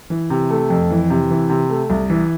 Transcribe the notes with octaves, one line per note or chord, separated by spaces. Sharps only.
E3
C3
A3
F2
E3
C3
E3
C3
A3
C2
E3